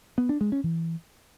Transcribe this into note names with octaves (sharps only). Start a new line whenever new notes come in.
B3
D4
G#3
C#4
E3